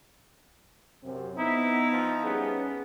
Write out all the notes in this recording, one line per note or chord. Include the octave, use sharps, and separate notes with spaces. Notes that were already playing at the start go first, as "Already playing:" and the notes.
F#2 C3
B3 D#4 E4
F3
G3 B3 C#4 G#4